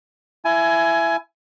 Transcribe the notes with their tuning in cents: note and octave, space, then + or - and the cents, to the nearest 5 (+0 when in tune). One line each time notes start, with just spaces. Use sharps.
E4 +20 G#5 +20